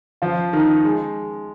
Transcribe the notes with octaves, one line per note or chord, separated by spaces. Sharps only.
F3 F4
D#3 D#4
G#3